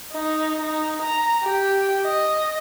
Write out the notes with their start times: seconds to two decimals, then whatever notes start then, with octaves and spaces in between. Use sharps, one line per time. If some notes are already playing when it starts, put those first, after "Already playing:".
0.12 D#4
0.61 D#4
1.02 A#5
1.43 G4
2.05 D#5